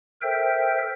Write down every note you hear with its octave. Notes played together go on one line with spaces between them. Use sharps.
A4 A#4 C5 E5 G5